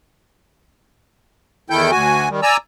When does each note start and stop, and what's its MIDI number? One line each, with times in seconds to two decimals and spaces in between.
1.70 1.91 40
1.70 1.91 51
1.70 1.91 64
1.70 1.91 69
1.70 1.91 79
1.70 1.91 91
1.91 2.29 38
1.91 2.29 66
1.91 2.29 80
2.29 2.41 51
2.29 2.41 55
2.43 2.57 74
2.43 2.57 80
2.43 2.57 82
2.43 2.57 88